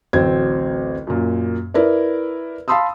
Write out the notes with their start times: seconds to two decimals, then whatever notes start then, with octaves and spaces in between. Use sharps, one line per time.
0.13 A1 D2 F#3 C4 G#6
1.07 F#2 A#2
1.74 E4 A#4 B4 D5
2.68 F5 A5 B5 C6 D#6 E6